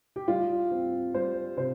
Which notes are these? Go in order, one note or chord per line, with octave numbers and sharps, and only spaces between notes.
G4
G3 F4
C4
G3 C5
C3 C5